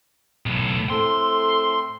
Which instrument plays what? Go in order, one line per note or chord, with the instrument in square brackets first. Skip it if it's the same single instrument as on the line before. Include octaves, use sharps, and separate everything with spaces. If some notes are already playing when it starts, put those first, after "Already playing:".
[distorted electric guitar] B1 A2
[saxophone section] A2 C4 A4 [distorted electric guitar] C6